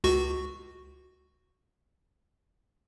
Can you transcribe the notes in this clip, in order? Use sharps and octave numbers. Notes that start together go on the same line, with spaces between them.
C#2 F#4 C#6